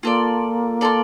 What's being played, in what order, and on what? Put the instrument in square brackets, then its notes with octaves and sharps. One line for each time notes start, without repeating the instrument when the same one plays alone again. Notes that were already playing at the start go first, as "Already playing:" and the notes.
[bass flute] A#3 [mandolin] F4 A4 D5
[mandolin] F4 A4 D5